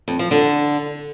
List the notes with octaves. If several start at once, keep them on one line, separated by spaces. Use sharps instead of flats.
F2
F3
D3